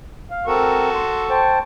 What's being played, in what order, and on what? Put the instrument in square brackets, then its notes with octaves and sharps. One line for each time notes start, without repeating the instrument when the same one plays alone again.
[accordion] F5
[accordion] C4 A#4 [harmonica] F#4 A4 C#6
[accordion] C6
C5 G5 A5